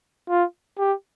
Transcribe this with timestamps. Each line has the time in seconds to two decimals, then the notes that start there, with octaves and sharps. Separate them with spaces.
0.29 F4
0.78 G4